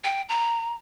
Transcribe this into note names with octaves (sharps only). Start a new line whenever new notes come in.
G5
A#5